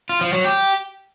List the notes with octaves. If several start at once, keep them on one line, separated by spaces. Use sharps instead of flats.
F4
F3
F#3
G4